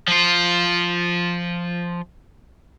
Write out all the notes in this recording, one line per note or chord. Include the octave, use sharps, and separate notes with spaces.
F3 F4